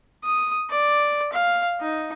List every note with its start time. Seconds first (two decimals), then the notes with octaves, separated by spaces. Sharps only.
0.25 D#6
0.71 D5
1.33 F5
1.81 D#4